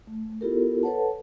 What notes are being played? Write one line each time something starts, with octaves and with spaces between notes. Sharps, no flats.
A3
B3 E4 F4 G4 A4 A#4
A4 B4 C#5 F#5 A5